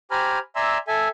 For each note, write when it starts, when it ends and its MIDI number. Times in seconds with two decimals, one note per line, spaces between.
0.11 0.39 67
0.11 0.39 72
0.11 0.39 80
0.11 0.39 82
0.11 0.39 83
0.11 0.39 89
0.56 0.78 74
0.56 0.78 76
0.56 0.78 80
0.56 0.78 82
0.56 0.78 84
0.56 0.78 88
0.88 1.08 69
0.88 1.08 76
0.88 1.08 80